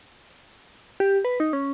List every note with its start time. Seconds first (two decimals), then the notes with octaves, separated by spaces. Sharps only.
1.00 G4
1.25 B4
1.40 D#4
1.53 C#4